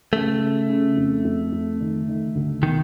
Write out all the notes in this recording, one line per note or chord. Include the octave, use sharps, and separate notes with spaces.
C#3 A3
C#3
C#3
F2
F2
F2
D#3
D#3
D2
B2 D#3